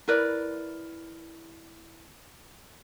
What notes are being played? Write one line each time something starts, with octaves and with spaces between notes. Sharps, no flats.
E4 A#4 B4 D5